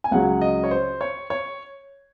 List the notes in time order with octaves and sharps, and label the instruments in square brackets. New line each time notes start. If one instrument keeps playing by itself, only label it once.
[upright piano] G#5
C#2 C#3 F#3 F#5
D#5
C#5
C5
C#5
C#5